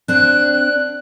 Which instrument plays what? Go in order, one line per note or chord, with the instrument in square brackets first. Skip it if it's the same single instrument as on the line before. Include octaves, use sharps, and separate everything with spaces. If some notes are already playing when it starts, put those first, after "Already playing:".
[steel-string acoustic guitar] C4 D4 [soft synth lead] F#6